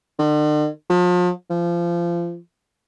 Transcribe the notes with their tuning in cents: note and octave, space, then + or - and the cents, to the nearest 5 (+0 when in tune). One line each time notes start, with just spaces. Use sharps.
D3 +45
F3 +40
F3 -25